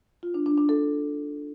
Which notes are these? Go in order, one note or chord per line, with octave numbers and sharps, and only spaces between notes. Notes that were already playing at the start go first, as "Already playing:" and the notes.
F4
D4
D4
D4
A4